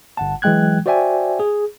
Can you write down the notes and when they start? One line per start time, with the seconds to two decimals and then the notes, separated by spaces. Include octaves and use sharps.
0.17 G1 F#5 A5
0.42 E3 F#3 G#3 G5 F#6 G#6
0.86 F#4 C5 D5 E5 G5 G#5
1.40 G#4